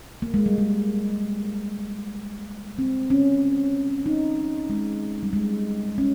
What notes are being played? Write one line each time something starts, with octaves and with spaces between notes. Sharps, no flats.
A#3
G#3
G3
G#3
C4
C#4
D#4
G#3
G3
G#3
C#4